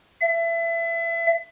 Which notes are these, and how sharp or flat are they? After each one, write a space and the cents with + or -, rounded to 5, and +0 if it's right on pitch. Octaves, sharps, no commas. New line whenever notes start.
E5 +30